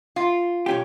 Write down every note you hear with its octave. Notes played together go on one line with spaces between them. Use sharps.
F4
B1 C#4 G4